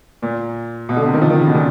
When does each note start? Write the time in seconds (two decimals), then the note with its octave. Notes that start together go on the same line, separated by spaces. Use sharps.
0.22 A#2
0.89 B2
0.97 D3
1.06 C3
1.14 D#3
1.22 F3
1.30 D#3
1.38 C#3
1.47 B2
1.55 A#2